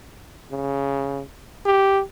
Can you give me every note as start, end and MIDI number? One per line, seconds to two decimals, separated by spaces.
0.51 1.22 49
1.65 2.02 67